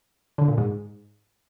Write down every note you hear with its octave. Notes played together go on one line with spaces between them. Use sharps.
D3
A#2
G#2